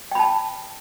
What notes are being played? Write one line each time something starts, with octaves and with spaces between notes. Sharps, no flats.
G5 A5 B5